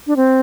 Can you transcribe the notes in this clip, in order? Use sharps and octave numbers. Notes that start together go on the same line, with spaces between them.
D4
C4